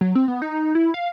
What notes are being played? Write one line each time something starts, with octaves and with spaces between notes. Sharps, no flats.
F#3
C4
B3
D#4
E4
F5